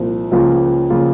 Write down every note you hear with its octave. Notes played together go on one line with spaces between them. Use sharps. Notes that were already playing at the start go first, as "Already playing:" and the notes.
Already playing: C2 A#2 F3 C4
C#2 C#3 F3 A#3 F4
C#3 F3 A#3 F4